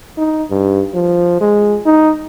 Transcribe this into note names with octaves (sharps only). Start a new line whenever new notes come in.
D#4
G2
F3
G#3
D#4